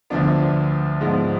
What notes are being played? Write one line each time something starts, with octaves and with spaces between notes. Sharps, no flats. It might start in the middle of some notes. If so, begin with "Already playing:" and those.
D2 D3 F3 B3 D4
G#2 F3 G#3 B3